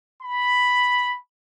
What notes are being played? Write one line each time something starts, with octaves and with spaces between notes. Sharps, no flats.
B5